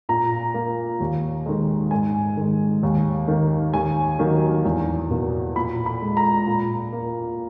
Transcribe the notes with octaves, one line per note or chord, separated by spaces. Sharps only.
A#2 A#5
A#3
D#2
D#3 G#3
G#2 G#5
D#3 G#3
D#2
D#3 A#3
D#2 G#5
D#3 F#3 A#3
E2
B2 A#3
A#2 B5
B5
G#3
A#5
A#2
A#3